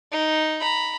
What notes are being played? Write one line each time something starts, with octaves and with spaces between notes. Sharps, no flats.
D#4
A#5 B5